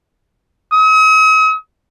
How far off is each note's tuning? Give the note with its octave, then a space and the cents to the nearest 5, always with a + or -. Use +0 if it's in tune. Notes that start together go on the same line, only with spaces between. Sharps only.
D#6 +45